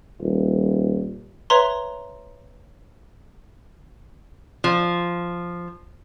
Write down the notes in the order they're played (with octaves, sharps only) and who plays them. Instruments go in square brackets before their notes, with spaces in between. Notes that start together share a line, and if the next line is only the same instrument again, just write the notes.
[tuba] D#1
[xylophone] B4 C#5 E5 A#5 C6
[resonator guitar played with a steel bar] F3